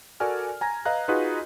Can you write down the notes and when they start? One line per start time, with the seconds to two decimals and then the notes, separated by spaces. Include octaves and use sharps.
0.20 F#4 A4 A#4 D5 G#5 F6
0.61 G#5 A#5 G#6 A#6
0.85 B4 D#5 F5 A#5 F#6
1.08 D#4 F4 F#4 G#4 B4 D#5